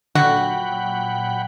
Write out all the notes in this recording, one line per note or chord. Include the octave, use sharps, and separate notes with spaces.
A#2 D3 F#3 F#4 F#5 G5 B5